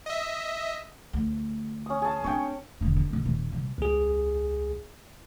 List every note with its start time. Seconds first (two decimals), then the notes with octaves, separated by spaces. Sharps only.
0.06 D#5 E5
1.13 D2
1.86 C#4 D#6
2.02 G#4 A5
2.24 C4 D4 C#5 G5
2.81 E1 D3
2.97 D2
3.10 F#1 B1
3.26 D#1
3.52 C2 A#2
3.78 C#2 G#4